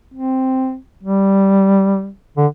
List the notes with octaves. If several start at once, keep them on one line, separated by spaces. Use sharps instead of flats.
C4
G3
D3